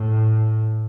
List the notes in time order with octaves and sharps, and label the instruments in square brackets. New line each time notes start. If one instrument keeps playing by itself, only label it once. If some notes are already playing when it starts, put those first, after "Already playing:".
Already playing: [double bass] A2